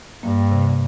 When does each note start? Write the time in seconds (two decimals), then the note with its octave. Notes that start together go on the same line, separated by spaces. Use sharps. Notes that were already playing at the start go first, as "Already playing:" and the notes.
0.23 G2 A#3
0.52 C3